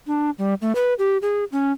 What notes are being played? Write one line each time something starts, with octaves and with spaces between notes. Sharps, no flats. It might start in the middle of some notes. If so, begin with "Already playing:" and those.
D4
G3
A3
B4
G4
G#4
C#4